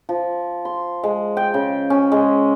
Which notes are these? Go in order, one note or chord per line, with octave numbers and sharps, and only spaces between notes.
F3
C6
G#3
G5
C#3
C#4
G#3